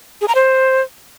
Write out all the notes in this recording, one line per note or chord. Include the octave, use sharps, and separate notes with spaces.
G#4
A#5
C5